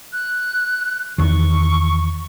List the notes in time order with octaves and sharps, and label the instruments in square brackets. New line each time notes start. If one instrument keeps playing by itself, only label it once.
[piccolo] F#6
[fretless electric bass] E2 D#3 [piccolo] C#6